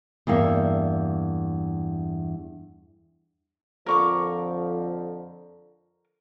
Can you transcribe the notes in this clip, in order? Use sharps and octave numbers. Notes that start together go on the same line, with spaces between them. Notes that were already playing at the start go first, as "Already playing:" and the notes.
E2 G2 A#3 E5
F2 D3 F3 A#4 C#6 D6